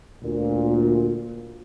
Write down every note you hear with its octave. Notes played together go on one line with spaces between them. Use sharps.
D2 A#2